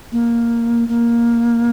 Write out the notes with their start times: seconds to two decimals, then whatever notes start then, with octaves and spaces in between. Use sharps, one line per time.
0.12 A#3
0.88 A#3